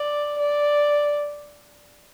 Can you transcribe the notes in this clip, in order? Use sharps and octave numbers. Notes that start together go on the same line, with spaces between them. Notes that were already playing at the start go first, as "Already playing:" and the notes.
Already playing: D5
D5